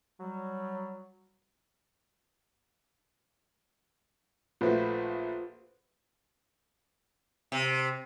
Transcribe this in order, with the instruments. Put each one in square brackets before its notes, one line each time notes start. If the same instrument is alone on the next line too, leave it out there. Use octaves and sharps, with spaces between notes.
[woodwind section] F#3 G3
[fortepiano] A#1 A3 F#4 [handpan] F4 B4 C5
[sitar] C3